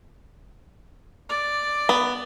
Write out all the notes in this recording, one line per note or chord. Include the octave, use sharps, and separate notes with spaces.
D5
B3